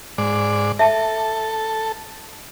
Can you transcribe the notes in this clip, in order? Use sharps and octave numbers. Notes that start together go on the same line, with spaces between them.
G#2 D5
A4 E5 A5